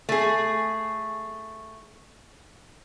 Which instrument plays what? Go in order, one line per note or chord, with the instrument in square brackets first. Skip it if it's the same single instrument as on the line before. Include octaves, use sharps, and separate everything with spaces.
[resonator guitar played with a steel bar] A3 G#4